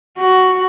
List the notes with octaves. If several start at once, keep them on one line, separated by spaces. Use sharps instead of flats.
F#4